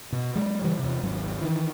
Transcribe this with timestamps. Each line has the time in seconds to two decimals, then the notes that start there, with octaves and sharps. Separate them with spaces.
0.12 B2
0.36 F#3 G#3
0.62 C#3 E3 G3
0.79 E2 C3
1.03 D#1 G#1 F#3
1.41 D#3 E3